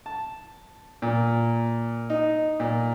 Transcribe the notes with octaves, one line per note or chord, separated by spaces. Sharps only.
A5
A#2
D#4
A#2